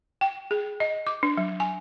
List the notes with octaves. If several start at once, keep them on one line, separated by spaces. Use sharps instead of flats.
G5
G#4
D#5
D6
D4
F#3
G#5